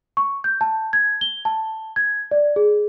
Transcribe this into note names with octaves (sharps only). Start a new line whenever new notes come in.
C#6
G6
A5
G#6
G7
A5
G#6
D5
G#4